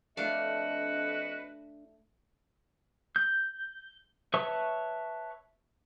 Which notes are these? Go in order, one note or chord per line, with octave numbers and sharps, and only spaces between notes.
F2 A3 D4 F#4 A4 B4 D#5 F5
G6
B4 C#5 E5 A5 C#6